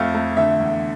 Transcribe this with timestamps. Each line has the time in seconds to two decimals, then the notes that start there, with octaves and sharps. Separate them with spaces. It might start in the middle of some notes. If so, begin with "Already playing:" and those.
Already playing: F2 A3 F5
0.15 A3
0.37 D3 E5
0.60 E2